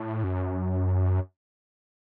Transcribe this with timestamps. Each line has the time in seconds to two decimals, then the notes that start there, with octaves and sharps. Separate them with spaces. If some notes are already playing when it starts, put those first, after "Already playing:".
Already playing: A2
0.24 F#2